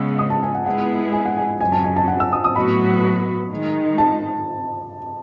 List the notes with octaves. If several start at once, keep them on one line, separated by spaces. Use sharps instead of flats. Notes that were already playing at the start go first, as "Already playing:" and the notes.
Already playing: C#3 G#3 B3 E6
D#6
A5
G#5
F#5
G#3 B3 E4 G#4 F#5
G#5
F#5
G#5
F#2 C#3 F#3 G#5
A5
G#5
A5
F#5
E6
D#6
D#6
A2 F#3 B3 F#4 B4 B5
D#3 G#3 D#4
A5